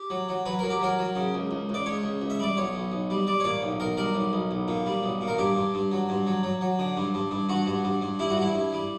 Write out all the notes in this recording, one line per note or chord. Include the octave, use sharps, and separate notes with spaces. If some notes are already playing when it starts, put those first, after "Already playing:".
Already playing: G4
F#3
F#3
F#3 B4
F#3 A#4
G4
F#3 A#4
F#3
C#3
C#2
C#2
C#2 D5
C#2 C#5
C#2
C#2
E5
G3 D5
B1 C#5
B1
B1
G3
G3 D5
C#5
A#2 D5
B1
B1 A#4
G3 A#4
B1
B1
B1
A#2
G3
B1
A#2
A#4
G2 G4
G2
G2
F#3
G2
F#3
F#3
F#3
D3
G2
G2
G2
G2 F#4
G2
G2
G2
G3 E4
F#4
G2 E4
G2
G3